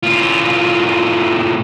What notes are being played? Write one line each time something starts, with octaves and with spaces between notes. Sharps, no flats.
A2 F4